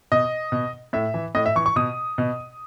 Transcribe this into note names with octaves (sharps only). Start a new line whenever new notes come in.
B2 D#5
B2
A2 E5
E3
A2 D#5
E5
E3 C#6
C#6
B2 D#6
B2